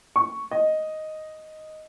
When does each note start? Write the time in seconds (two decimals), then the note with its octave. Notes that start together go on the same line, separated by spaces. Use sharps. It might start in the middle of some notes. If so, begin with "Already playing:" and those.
0.16 C#6
0.51 D#5